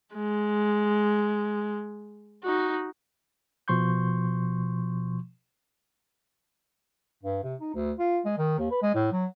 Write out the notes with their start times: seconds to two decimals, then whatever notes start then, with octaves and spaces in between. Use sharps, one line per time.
0.14 G#3
2.43 D#4 F#4
3.68 B2 F3 C6 C#6 G6
7.23 G2
7.43 C3
7.61 D#4
7.74 D2
7.99 F4
8.25 G#3
8.38 D#3
8.59 D#2
8.71 B4
8.82 G#3
8.95 A2
9.12 F#3